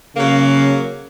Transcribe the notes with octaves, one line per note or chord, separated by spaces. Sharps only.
C#3 F#3 A#3